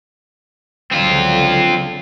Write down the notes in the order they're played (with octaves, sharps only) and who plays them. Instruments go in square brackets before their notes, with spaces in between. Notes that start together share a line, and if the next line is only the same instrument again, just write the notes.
[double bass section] C#2 D3 F#3 [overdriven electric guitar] C4 F4